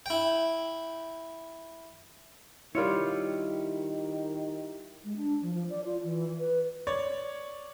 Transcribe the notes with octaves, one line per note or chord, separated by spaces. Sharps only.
E4 G5
D#3 G3 E4 F4 G4 A#4 C#5 C#7
G#3
D4
F3
F3
D5
F4
E3
B4
C#5 D5